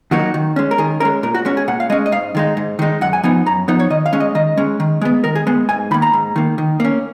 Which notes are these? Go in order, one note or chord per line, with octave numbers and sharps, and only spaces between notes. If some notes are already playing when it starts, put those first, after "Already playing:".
D#3 F#3 A#3 D#4 F#4
D#3
G#3 C#4
A#4
D#3 G#4
G#3 C#4 A#4
A#2 A#4
F#4
G#3 C#4 F#4
G#4
A#2 F#5
F5
G#3 C#4 D#5
D#5
G#2 F5
D#3 G#3 D#4
G#2
D#3 G#3 D#4
F#2 F#5
G#5
F3 B3 D#4 G#5
F#2 A#5
F3 B3 D#4 B4
C#5
D#3 D#5
F5
G#3 C#4
D#5
D#3 D#5
G#3 C#4
D#3
G#3 B3
D#3 A#4
G#4
G#3 B3
G#2 G#5
D#3 A#3 B5
A#5
G#2
D#3 A#3
D#3
A#3 C#4